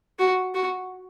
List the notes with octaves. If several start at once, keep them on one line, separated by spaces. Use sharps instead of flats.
F#4
F#4